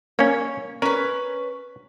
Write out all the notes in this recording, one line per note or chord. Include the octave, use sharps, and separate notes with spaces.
A#3 C#4 C#5
C#4 A#4 B4